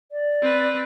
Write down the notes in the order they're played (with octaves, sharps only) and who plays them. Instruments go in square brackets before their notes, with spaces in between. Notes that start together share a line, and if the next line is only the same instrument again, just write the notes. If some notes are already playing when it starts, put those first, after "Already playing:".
[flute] D5
[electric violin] C4 B4